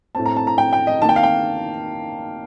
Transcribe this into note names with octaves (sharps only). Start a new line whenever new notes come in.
A2 A3 C4 A5
A#5
A5
A#5
G5
G5
D#5
D#3 A#3 G5 A5
F5
G5